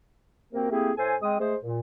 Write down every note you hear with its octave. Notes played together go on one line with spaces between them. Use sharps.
C3 A#3 C4 F#4 A#4
A3 A#3 C4 E4 G4 G#4
A2 A4 C5 G#5
G#3 C4 D#6
G#3 A3 G#4 C5
A#2